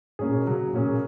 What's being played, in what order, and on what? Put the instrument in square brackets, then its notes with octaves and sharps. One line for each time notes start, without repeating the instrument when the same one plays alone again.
[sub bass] G#2 [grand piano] A#3 C#4 G#4
[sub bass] A#2
B2
[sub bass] C#3 [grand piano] F#3
[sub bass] A#2 [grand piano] A#3 C#4 G#4
[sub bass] A#2